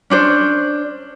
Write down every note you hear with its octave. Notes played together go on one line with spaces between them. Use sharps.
C#4 D4 C5